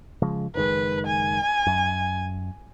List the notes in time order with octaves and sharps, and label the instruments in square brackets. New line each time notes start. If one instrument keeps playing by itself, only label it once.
[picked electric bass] C#3 F3 G#3
[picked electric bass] F#1 D#3 G#3 [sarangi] B4
[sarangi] G#5
[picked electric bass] F#2